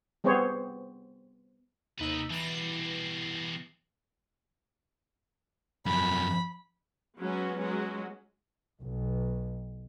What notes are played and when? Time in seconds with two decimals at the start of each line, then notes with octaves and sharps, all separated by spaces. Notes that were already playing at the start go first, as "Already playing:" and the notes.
0.24 G3 B3 C4 G#4 C5 C#5
1.99 D#2 C3 D#4 B4 E6
2.30 B2 E3 G3 A#6 C7
5.86 F#2 F3 B5
7.18 F#3 G#3 B3 C#4 F#4
7.58 F#3 G#3 C#4 F#4
8.81 B1